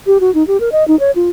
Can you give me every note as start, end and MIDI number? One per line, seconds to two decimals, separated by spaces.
0.07 0.18 67
0.20 0.33 66
0.35 0.46 63
0.47 0.60 67
0.60 0.69 70
0.72 0.86 75
0.88 0.98 63
1.00 1.11 73
1.16 1.30 65